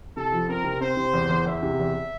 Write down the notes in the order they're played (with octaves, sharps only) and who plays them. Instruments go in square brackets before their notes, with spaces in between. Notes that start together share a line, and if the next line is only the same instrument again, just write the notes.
[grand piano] C3 [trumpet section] A4
[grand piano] F3
[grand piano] C4 [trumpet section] A#4
[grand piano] C3
[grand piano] C4 [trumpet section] C5
[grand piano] C3
E2
E2
[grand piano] E2 [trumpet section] E5
[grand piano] C3
E2